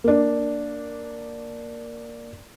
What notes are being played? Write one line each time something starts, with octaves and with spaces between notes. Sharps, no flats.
A#3 D4